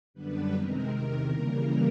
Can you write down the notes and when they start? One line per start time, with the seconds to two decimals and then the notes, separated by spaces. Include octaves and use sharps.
0.14 F#2 D3 G3 B3 D4 B4
0.52 C3 D#3 G#3 C4 A#4
0.90 E2 C3 D#3
1.28 C#3 E3 G3 A#3